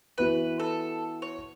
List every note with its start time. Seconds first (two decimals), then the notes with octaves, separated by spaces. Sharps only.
0.18 E3 B3 F#4 B4
0.60 A4
1.22 C#5